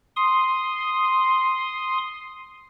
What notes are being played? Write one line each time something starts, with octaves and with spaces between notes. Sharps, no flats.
C6 D#6